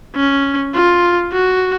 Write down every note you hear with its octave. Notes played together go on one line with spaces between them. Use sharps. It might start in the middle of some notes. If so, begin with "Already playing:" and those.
C#4
F4
F#4